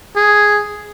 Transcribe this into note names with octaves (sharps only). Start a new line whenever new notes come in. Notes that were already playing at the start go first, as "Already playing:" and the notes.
G#4